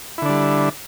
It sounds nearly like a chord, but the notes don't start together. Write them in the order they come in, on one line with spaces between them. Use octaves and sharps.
E4 D3 D4 G3